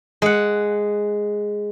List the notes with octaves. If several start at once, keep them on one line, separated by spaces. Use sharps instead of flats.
G#3 F#5